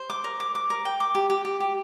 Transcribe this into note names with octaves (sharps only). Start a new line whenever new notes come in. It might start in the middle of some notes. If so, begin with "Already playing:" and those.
Already playing: C5
D6
A#4
D6
D6
A#4
G5
D6
G4
G4
G4
G4